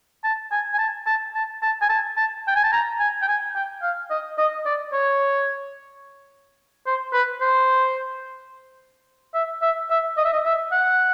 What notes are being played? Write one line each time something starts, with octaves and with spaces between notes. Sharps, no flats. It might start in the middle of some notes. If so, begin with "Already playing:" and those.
A5
G#5
G#5
A5
A5
A5
A5
G#5
A5
A5
G5
G#5
A5
A#5
G#5
G5
G#5
G5
F5
D#5
D#5
D5
C#5
C5
B4
C5
E5
E5
E5
D#5
E5
D#5
E5
F#5